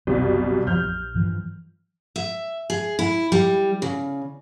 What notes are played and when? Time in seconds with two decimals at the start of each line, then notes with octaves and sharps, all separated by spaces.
0.07 F#1 C2 F#2 B2
0.67 F2 F3 F6 G6
0.82 A#1
1.14 G2 E3 F3
2.16 E5
2.70 G#4
2.99 E4
3.32 G3
3.82 C#3